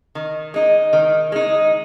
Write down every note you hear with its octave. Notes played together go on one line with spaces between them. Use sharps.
D#3
G#3 D#4
D#3
G#3 D#4